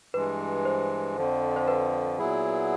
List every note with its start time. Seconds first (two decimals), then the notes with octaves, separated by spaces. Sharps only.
0.14 G2 E3 G#3 B4
0.65 C5
1.16 F2 D3 F3
1.56 C5
1.68 B4
2.18 A#2 F#3 B3 E4 G#4